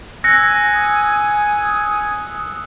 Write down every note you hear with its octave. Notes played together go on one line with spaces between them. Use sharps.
G#5 E6 F#6 A#6 C#7
D#6